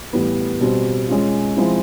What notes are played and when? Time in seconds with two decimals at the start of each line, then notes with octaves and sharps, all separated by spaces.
0.13 A2 E3 G3 B3
0.60 B2 G3 C4
1.08 G#3 C#4 F4
1.56 F3 G#3 C4 E4